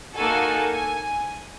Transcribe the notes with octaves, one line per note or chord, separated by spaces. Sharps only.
A#3 D#4 F#4 A4 G#5
G#5